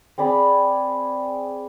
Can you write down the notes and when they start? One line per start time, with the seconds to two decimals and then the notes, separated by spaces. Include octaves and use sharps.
0.18 C4 G#4 D5 B5